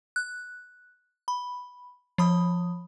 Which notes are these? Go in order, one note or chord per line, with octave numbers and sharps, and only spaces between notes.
F#6
B5
F3 B5 D#6